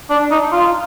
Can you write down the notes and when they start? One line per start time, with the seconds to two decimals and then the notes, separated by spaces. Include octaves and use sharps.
0.10 D4
0.31 D#4
0.52 F4